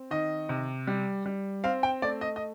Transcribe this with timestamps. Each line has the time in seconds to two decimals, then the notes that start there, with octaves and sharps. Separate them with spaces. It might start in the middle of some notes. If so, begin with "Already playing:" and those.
Already playing: C4
0.11 D#3 D#5
0.49 C3
0.87 G3
1.26 G3
1.64 C4 F5
1.83 G5
2.02 A3 D5
2.21 D#5
2.36 D#5